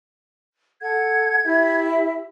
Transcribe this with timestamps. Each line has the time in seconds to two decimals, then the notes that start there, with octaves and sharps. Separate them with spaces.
0.81 A4 F#5 G#6
1.44 E4 G4 E5